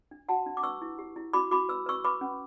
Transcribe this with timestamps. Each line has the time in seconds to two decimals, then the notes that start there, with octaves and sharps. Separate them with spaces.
0.11 D4
0.29 F#4 F#5 A5
0.46 D4
0.57 D6
0.63 B4 C#6 E6
0.82 E4
0.99 G4
1.16 E4
1.33 F#4 B5 D6
1.51 F#4 B5 D6
1.69 B4 E6
1.86 B4 C#6 E6
2.04 B4 B5 D6
2.21 C#4